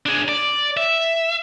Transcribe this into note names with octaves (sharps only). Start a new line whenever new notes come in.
D4 G#4
D5
E5